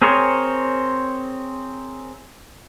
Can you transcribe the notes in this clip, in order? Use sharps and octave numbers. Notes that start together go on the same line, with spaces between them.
C4 G#4 A#4 C5 C#5